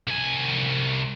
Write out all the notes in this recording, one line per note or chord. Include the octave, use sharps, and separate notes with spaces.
C2 G#5